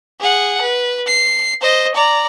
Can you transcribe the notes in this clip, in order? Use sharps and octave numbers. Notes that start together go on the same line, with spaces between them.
G#4 F#5
B4
C7
C5 D#5
D5 A#5